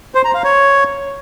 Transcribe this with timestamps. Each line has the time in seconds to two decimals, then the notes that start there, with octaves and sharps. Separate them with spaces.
0.15 C5
0.25 A#5
0.34 F5
0.44 C#5